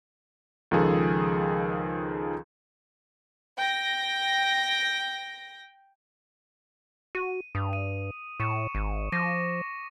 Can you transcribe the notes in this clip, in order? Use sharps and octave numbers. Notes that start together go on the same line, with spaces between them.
C#2 D#3 F3 G#4 A4
G5 A#6
F#4 D#7
G2 D#6
D#7
A2 C#6 C#7 E7
G#1
F3 D6 A#6 D#7